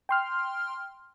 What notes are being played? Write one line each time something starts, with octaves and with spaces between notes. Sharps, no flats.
G5 C6 F6